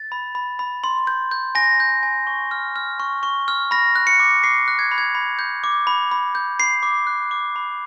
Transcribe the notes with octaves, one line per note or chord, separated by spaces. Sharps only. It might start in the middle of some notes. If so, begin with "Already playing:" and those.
Already playing: A6
B5
B5
B5
C6
G6
G6
G#5 A#6
G6
G#5
C#6
F6
F6
C#6
C#6
F6
B5 A#6
F#6
C#7
D6
D6 C7
F#6
G#6
B5
G#6
B5
G6
D6
B5
B5
G6
B5 C7
D6
F#6
D6
B5